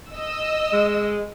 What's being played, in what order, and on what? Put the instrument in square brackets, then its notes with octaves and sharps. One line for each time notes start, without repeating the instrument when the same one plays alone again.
[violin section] D#5 E6
[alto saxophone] G#3